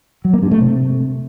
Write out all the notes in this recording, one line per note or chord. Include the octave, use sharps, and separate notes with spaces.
F#3
A#3
G2
A3
C3